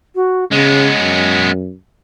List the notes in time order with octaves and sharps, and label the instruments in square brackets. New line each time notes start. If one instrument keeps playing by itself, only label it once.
[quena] F#4
[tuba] C#3 [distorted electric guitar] G#3 B3 [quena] C#5
[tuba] F#2